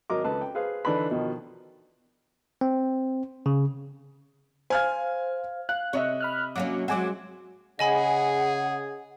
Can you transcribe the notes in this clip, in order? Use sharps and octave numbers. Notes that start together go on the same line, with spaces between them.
G#1 F#3 A#4 D#5 D6
C#2 A4 B4 A5
G5
G#4 B4 C5 F5
D3 E3 D4 D#4 B4 B5
B2 D#3 F3
C4
C#3
C5 F5 G#5 F6 G#6
F5 F#6
C3 C#5 D#5 E5
B5 F6 F#6
F#3 A#3 C#4 D6
F#3 G#3 C4 F#5 G#5 D6
C#3 G#4 D#5 F#5 G#5 B5